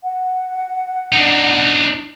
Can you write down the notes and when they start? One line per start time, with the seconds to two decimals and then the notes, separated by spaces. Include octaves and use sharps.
0.03 F#5
1.12 D4 D#4